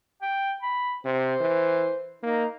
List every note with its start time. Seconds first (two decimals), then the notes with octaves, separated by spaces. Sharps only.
0.22 G5
0.62 B5
1.05 C3 C5
1.40 E3
2.23 A#3 D#4